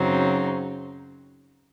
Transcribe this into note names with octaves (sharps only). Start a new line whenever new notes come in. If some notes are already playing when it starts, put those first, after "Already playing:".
Already playing: F#2 C#3 F#3 C4 D#4